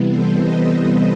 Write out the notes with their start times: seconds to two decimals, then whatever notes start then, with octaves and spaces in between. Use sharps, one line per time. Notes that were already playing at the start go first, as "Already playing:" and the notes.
Already playing: C3 E3 G3 B3
0.09 A4 C5
0.37 B4 D#5